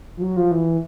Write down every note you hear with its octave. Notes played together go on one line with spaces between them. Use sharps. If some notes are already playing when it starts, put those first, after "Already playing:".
F3
F#3
F3
E3